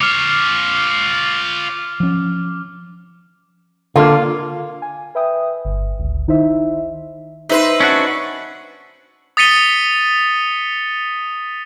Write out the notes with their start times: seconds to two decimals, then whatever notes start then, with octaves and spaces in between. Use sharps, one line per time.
0.01 F4 C#5 D6 F6
2.00 F3 C#4
3.96 D3 A#3 F4
4.82 G#5
5.15 B4 E5 G5 D#6
5.65 G1
5.99 G1 C#2
6.28 D#3 D#4 E4 C5 E5
7.49 D#4 B4 C5 E5
7.80 C#4 D4 F#4
9.37 D#6 A6 B6 C#7 D#7 G7